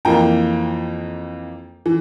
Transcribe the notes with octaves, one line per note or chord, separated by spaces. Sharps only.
F2 E3 A#3 G5 A#5
E3